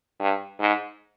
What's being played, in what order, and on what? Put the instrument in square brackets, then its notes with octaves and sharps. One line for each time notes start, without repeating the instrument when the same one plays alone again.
[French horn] G2
G#2